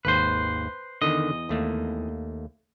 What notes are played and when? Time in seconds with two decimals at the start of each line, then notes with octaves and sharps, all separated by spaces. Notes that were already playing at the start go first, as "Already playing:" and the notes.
0.05 G#1 D#2 B4 C5
1.02 E2 D3 D#3 D#5
1.49 D#2 A3 A#3